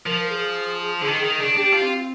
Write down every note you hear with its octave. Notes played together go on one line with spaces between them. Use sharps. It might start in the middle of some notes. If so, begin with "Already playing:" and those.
F3 A#4
A#4
G#4
D3
D#3
D#3
D4
D4 G4
F4
C4